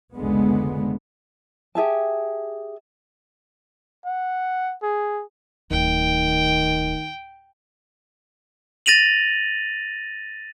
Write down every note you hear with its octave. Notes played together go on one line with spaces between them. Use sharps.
F1 C#2 D3 G#3 B3
G4 G#4 E5 A5
F#5
G#4
D1 D#3 G5
A6 A#6 D#7 F7 F#7